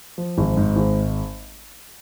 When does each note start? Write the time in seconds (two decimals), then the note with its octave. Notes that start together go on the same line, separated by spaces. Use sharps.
0.18 F3
0.38 G#1
0.57 G#2
0.76 G#1